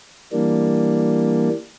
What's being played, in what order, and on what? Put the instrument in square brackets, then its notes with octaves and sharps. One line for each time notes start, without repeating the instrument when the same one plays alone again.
[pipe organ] E3 G3 A#3 D4